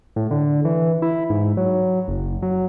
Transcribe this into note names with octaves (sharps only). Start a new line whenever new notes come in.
A2
D3
E3
E4
G#2
F#3
F#1
F#3